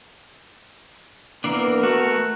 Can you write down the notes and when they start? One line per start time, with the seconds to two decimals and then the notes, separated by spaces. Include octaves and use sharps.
1.44 E3 A#3 B3 D4 A#4
1.83 A3 F#4